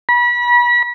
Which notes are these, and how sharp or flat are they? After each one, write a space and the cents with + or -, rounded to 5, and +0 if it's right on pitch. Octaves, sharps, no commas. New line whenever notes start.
B5 -35